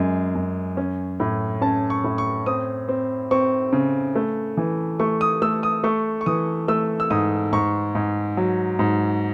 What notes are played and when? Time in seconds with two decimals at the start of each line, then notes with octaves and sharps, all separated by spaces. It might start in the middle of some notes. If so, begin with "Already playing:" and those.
Already playing: F#2 G#3
0.35 F#2
0.77 C#4
1.20 A2
1.61 C#4 A5
1.90 C#6
2.04 A2
2.18 C#6
2.46 C4 D#6
2.89 C4
3.31 C4 C#6
3.73 C#3
4.15 A3
4.57 E3
5.00 A3 C#6
5.21 D#6
5.42 A3 E6
5.63 D#6
5.84 A3 C#6
6.21 C#6
6.26 E3 D#6
6.68 A3 E6
7.00 E6
7.10 G#2 D#6
7.53 G#2 C#6
7.95 G#2
8.37 F#3
8.79 G#2